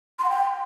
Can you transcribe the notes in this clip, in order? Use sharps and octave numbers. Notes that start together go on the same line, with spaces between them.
C6
F#5
G5